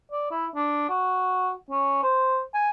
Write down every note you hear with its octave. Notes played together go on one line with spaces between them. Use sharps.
D5
E4
D4
F#4
C#4
C5
G#5